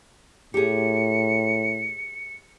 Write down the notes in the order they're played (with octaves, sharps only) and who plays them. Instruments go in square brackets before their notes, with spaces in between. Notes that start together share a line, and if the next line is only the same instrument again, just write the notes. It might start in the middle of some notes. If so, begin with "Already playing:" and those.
[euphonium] A2 [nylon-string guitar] G4 G#4 [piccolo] C#7